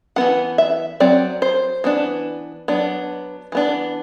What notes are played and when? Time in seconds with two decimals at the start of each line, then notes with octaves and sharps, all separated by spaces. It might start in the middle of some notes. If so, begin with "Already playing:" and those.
0.16 E3 B3 D4 F#5
0.58 E5
1.00 F#3 C4 D5
1.42 C5
1.84 E3 B3 D4
2.68 F#3 B3 D4
3.52 E3 B3 D4